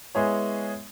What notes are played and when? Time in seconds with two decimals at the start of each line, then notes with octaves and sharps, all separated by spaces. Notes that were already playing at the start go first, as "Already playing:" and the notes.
0.15 G#3 B3 E4 G#4 C#5